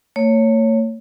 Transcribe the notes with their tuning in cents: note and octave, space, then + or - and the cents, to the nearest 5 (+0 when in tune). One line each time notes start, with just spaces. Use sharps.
A3 +45 C#5 +0